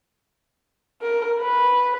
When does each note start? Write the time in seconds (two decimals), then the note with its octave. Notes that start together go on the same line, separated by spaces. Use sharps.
1.01 A#4
1.40 B4